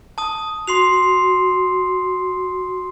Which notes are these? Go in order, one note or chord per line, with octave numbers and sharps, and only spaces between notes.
A5 D#6
F#4 C6 C7 F7